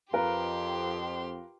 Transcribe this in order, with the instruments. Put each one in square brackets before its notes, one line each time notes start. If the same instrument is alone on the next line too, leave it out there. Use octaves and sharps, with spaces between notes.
[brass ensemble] F2 [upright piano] F4 A#4 B4 [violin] G4 C6